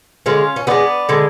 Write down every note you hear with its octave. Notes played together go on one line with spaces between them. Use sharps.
D3 G#3 C#4 F4
C#4
D3 G#3 B3 D4
D3 G#3